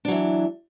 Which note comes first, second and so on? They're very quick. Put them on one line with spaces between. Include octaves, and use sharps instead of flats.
D4 F#3 E3